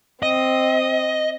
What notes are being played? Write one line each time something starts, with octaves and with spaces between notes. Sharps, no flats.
C4 D#5